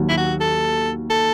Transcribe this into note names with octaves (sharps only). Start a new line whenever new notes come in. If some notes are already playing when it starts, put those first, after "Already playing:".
Already playing: D#2 D#3 F#3
E4
F#4
A4
A4